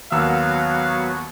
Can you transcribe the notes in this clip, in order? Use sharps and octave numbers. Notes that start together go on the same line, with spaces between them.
D#2 F#3 A#3 B3 F#4 F5 E6